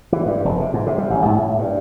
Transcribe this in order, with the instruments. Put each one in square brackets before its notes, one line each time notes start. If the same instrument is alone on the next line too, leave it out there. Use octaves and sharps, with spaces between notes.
[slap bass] E3
G2
F1
C3
G#2
C3
G3
A1
G#2
A2
G2